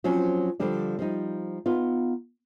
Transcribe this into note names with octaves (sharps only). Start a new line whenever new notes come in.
F3 F#3 C4 C#4
D3 F3 G3 D4
F3 G3 D#4
B3 D#4 F4